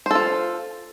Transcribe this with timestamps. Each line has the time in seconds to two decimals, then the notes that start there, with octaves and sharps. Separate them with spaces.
0.06 C5
0.11 A4
0.15 F4